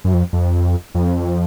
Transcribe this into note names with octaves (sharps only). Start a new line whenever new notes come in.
F#2
F2
F2
F2